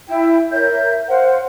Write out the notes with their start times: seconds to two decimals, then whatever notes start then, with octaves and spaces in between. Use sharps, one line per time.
0.08 E4 G5
0.51 A#4 C#5 E5 G6
1.09 C5 F5 F#5